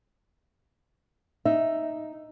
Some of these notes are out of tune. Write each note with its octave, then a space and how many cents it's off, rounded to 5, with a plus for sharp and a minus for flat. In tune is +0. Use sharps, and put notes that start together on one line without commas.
D#4 +0 E5 +0